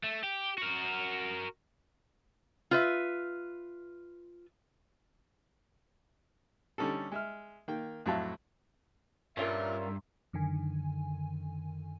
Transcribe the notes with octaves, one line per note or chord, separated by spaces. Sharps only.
A3
G4
F#4 A#4
F4 B4 E5
D3 G3 C#4 D#4 A4
G#3 E5 F6
D#3 A#3 G5
F2 A2 F#3 E5 F5 A5
G2 A#2 C#4 F4 A#4 E5
F#2 D3 D#3 G#5